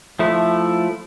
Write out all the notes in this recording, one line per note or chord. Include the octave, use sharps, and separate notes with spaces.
F3 A3 E4